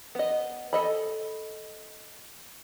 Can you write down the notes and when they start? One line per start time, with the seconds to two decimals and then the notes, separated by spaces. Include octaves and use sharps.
0.15 B3 D#5
0.73 A4 D#5 B5